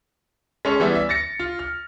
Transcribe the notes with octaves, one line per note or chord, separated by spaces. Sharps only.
G#3 C#4 A4 C#6
E3 G3 B3 C#4 E4
E5
A6 A#6 C#7
F4
F6